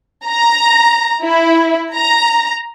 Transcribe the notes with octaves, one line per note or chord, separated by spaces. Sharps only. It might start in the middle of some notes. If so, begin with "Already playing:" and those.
A#5
E4
A#5